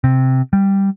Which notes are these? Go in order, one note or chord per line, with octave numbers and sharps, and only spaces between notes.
C3
G3